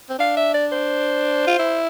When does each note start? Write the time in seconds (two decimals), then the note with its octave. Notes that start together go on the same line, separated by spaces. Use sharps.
0.09 C4
0.19 D4 F5
0.37 E5
0.54 D5
0.72 C5
1.47 F4
1.59 E4